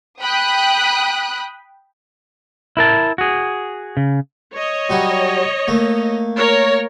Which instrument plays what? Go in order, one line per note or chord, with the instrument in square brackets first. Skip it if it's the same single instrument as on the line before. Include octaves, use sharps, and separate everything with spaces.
[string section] G5 B5 D#6 F#6
[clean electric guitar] E4 A#4 A5
F#4 G#4
C#3
[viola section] C#5 D#5
[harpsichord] F#3 G3 F#4
A3 A#3
[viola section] A#4 C#5